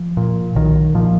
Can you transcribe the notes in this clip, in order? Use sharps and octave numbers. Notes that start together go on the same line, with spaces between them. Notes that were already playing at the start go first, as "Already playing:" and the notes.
Already playing: F3
A#2
B1 D#3
A#2 F3